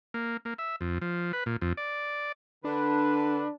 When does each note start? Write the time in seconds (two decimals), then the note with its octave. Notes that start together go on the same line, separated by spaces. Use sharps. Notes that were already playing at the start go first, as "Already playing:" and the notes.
0.14 A#3
0.45 A#3
0.59 E5
0.81 F2
1.02 F3
1.33 B4
1.46 A#2
1.61 F2
1.77 D5
2.64 D3 D4 B4